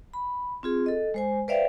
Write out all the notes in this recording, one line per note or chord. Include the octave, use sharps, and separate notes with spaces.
B5
C4 F4 G#4
A4 D#5
G#3 C5 G#5
B4 C5 D5 E5 F5 G5